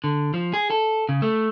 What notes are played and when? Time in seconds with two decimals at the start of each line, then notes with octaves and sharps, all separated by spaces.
0.04 D3
0.34 F3
0.54 G#4
0.70 A4
1.09 C#3
1.22 A3